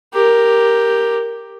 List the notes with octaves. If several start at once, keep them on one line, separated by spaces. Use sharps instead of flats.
G4 A#4